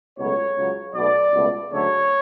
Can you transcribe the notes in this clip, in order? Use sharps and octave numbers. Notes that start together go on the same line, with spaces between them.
C#2 B2 F#3 A3 C#5
C#2 C#3 F#3
B1 B2 A3 D5
C#2 B2 A3
D2 C#3 F#3 A3 C#5